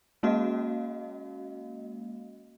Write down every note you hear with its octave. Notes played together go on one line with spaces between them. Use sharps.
G#3 A#3 C#4 F#4 D#5 F5